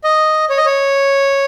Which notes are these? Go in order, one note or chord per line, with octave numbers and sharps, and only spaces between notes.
D#5
C#5
D#5
C#5